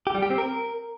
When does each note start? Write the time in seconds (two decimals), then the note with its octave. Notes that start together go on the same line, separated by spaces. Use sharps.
0.07 G4
0.15 G3
0.22 G4
0.30 C4
0.38 A#4